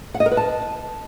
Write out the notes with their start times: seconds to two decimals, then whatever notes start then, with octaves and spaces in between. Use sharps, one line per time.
0.14 F#5
0.20 D#5
0.26 A#4
0.31 B4
0.37 A5